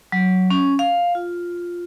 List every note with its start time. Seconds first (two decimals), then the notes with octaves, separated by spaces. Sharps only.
0.12 F#3
0.51 C#4
0.79 F5
1.15 F4